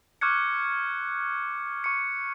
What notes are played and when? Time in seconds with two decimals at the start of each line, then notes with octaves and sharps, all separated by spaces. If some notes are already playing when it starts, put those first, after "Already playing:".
0.21 C#6 D6 F6 F#6 G#6 C#7
1.84 C#6 C#7